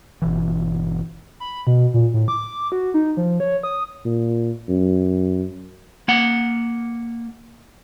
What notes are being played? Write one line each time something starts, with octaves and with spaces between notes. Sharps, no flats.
G1 B2 E3
B5
B2
A#2
A2
D6
F#4
D#4
F3
C#5
D#6
A#2
F#2
A#3 F#5